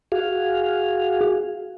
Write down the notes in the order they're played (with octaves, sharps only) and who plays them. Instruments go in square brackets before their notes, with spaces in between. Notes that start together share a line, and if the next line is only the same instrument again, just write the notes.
[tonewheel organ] F#4 G#4 F5